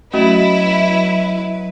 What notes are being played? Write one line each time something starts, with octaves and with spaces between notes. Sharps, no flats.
F#3 A3 C#4 E4 F#4 B4 D#5